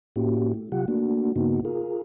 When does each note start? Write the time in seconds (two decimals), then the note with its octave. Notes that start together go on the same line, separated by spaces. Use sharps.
0.16 A2 A#3 C#4 E4 F#4 G4
0.54 A3
0.72 C3 F#3 F4 G4 F#5
0.88 A3 A#3 D4 F#4
1.36 G2 C#3 A#3 B3 D#4 F#4
1.65 F4 G#4 A#4